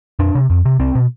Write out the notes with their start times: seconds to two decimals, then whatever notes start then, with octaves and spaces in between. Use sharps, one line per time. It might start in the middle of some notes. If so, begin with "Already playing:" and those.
0.19 F2 D4
0.35 C3
0.50 F2
0.65 C3
0.79 C2 C4
0.95 B2